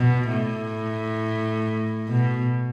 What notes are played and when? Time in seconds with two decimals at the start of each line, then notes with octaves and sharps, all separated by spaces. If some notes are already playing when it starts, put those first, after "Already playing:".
Already playing: B2
0.29 A2
2.09 B2